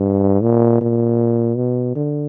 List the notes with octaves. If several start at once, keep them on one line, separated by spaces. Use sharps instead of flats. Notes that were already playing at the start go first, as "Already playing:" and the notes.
Already playing: G2
A#2
A#2
B2
D3